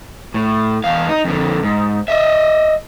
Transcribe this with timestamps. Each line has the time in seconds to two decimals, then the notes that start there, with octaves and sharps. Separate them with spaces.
0.34 A2
0.84 E2 F5
1.09 D#4
1.25 F2 D3
1.63 G#2
2.08 D#5 E5